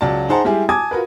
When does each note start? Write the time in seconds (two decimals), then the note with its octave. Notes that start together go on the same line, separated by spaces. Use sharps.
0.01 C#2 F#3 D5 A5
0.29 D#4 G#4 C5 F#5 A5 A#5
0.44 G3 G#3 E4 G4 G#4
0.69 G#5 A5 D6 D#6 G#6
0.91 F4 F#4 A#4 B4